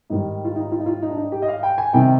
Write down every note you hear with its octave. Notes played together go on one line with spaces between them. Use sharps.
G#2 D#3 G3 D#4
F4
D#4
F4
D#4
F4
D#4
D4
D#4
G4
D#5
F5
G5
G#5
C3 D#3 G3 G5